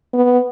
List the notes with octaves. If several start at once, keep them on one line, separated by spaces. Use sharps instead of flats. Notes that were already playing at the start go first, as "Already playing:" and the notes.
B3